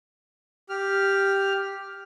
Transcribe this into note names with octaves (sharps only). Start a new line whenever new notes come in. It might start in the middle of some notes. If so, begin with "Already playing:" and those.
G4 F6